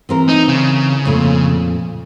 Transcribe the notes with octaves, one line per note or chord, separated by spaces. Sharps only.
E3 C4 A#4
D#4
C#3
F2 A#2 A3